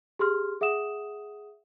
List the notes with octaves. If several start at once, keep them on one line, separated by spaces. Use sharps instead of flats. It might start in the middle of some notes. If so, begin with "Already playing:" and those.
G4 G#4 C6 F6
G#4 E5 F#5 D#6 E7